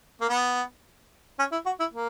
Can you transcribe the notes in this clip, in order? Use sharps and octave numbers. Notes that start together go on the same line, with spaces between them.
A#3
B3
C#4
E4
F#4
E4
A#3